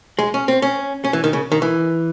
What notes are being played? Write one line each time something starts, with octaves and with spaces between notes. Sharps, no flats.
G#3
C#4
C4
C#4
C#4
E3
D#3
C#3
D#3
E3